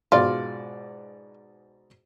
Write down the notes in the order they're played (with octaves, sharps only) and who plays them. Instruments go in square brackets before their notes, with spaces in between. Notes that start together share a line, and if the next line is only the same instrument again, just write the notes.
[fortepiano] G#2 B2 D5 [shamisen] F4